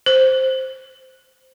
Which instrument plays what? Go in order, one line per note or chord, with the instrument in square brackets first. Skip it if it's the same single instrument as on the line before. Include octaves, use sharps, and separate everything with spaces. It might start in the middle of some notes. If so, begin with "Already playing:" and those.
[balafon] C5